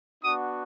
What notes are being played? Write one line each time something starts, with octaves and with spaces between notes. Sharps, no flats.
B3 D4 F#4 D#6